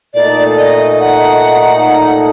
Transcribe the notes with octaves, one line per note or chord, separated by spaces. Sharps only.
A#2 A3 D#4 A4 D5
D#5
F#5